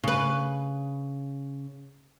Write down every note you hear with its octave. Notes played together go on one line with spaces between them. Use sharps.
C#3 B4